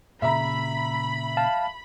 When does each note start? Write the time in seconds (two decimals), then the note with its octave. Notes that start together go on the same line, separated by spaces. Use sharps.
0.22 A#2 C#3 E5 A#5 B5
1.37 F5 A5